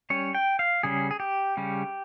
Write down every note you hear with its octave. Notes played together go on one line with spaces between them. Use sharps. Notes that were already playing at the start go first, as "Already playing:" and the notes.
G3 C#4 C#5
G5
F5
C#3 G3 C#4 G#4
G#4
G4
C#3 G3 C#4